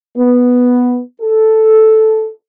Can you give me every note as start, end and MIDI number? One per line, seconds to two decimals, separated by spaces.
0.17 1.00 59
1.21 2.30 69